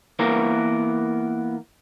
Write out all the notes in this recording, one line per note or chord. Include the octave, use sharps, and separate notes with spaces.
E3 A#3 B3 A#4